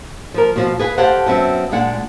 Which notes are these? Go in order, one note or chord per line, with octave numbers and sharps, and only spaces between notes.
F3 A#4
B2 F3 F5
G#4 B4 F5 G#5
G4 A4 C5 F5 F#5
F#2 B3 C4 E5
A#2 G#3 D4 F#5